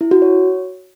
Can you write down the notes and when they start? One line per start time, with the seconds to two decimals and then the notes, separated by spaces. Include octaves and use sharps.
0.01 E4
0.11 F#4
0.22 C#5